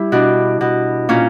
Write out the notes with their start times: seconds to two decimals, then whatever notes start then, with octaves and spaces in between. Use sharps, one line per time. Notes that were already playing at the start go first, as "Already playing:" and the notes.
Already playing: G3 E4
0.12 B2 D4
0.61 B2
1.09 A#2 C#4